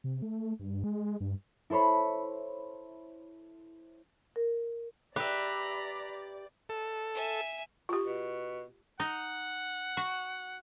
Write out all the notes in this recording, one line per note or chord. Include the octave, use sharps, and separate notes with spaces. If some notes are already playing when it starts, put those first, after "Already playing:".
C3
A3
G2
G#3
G2
E4 A4 C5 C#5 B5
A#4
G4 B4 D5 E5 A#5 B5
A4
E5 G#5
F4 G4
B2
D#4 F#5
F#4